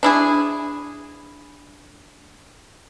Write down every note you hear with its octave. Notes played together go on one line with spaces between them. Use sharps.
D4 E4 G#4